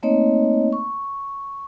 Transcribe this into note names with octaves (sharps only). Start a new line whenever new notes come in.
A3 A#3 C4 D#4 C#5 D#5
C#6